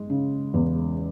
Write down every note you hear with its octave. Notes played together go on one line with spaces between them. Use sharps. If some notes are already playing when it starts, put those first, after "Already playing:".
Already playing: G#3
C#3
E2